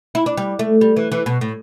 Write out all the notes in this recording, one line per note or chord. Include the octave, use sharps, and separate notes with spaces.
E4
D4
G3
A3
G3
E3
E3
B2
A2